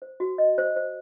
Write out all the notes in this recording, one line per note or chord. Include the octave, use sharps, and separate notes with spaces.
C5
F#4
D#5
C5
C5